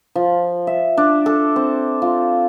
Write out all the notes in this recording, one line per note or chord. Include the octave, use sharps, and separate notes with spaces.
F3
E5
D4
A4
C4
F4